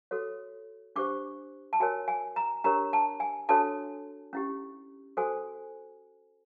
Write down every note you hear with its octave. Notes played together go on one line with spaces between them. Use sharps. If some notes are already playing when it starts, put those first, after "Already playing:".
F#4 A4 C#5
D4 G4 C5 D6
A5
F#4 A#4 C#5 G#5
G#5
A#5
D4 G4 A#4 C#5 A#5
A5
G#5
D4 F#4 A4 C#5 A5
C#4 E4 G4
F#4 A4 C5 G#5